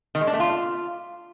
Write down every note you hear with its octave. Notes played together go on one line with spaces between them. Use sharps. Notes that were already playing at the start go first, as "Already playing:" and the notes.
D#3
G#3
D4
A3
F4